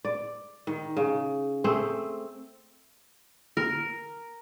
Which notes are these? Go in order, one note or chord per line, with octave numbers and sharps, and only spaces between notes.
D5
D#3
C#3
A3 C4 G#4
A#4